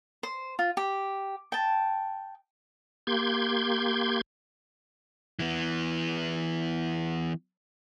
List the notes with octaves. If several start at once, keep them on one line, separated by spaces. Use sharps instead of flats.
C5
F4
G4
G5 A5
A#3 G4 C6 G6 G#6
E3 B3